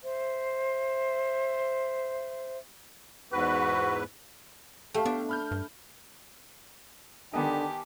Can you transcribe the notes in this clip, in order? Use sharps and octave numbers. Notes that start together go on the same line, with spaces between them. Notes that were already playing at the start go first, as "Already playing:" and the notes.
C5 E5
E2 G#2 F#4 B4
A3 G4 E5 F5
B3 D4
B5 F6 G6
G2
D3 D#3 B3 D#4 G4 G#5 A5 D6